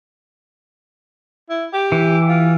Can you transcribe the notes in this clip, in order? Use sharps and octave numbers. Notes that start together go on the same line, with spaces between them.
E4
G4
E3
F4